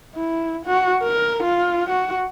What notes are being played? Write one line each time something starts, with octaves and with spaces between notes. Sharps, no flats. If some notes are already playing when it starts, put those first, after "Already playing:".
E4
F#4
A#4
F4
F#4